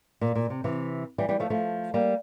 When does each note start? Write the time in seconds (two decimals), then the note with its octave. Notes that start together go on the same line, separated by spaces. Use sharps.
0.21 A#2
0.35 A#2
0.50 C3
0.64 C3 E3
1.18 E3 G3
1.29 E3 G3
1.40 F3 A3
1.50 F3 A3
1.94 G3 A#3